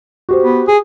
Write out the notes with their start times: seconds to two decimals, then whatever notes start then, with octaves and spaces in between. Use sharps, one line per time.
0.29 F#4 G4 C5
0.43 B3
0.68 G#4